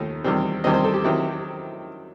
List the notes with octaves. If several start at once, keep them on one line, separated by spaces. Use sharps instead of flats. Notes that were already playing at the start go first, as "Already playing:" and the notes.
Already playing: D#2 D#3 A3 D#4
E2 D#3 G3 C4
E2 D#3 G3 C4 D#5
C5
A4
G4
D#3 F#3 C4 E4